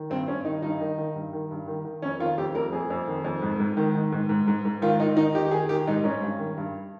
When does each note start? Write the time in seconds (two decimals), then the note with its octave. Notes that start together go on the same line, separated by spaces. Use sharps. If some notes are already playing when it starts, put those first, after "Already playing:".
Already playing: D#3
0.10 G2 C4
0.27 G2 C#4
0.45 D#3 D#4
0.62 G2 D#4
0.80 D#3
0.98 D#3
1.15 G2
1.33 D#3
1.51 G2
1.68 D#3
1.85 D#3
2.02 F2 C#4
2.19 D#3 F4
2.38 F2 G4
2.55 F2 A#4
2.73 F2 G#4
2.90 F2
3.07 D#3
3.25 F2
3.42 G#2
3.60 G#2
3.77 D#3
3.95 D#3
4.12 G#2
4.29 G#2
4.48 G#2
4.65 G#2
4.82 D#3 F4
5.00 D#3 D#4
5.17 D#3 D#4
5.35 D#3 G4
5.45 G4
5.51 D#3 G#4
5.69 D#3 G4
5.87 G#2 D#4
6.04 G#2 C#4
6.22 G2
6.39 D#3
6.57 G2